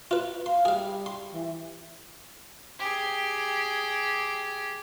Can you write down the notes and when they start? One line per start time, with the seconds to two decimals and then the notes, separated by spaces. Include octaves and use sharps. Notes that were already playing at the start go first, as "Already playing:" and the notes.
0.11 F4 B4
0.46 F5 C6
0.65 G3 G#4 F5
1.06 C6
1.31 E3
2.79 G4 G#4